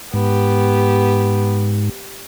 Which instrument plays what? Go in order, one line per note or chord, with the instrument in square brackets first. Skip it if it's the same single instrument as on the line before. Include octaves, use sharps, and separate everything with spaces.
[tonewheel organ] G#2 [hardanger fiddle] B3 G4